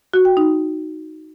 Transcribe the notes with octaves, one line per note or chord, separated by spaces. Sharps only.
F#4
G5
D#4